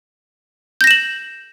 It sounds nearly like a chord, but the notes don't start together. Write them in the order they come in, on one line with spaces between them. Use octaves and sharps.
G6 A#6 E7 F#7